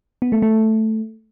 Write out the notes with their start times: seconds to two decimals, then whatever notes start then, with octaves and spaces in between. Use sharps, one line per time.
0.22 B3
0.32 A3
0.42 A3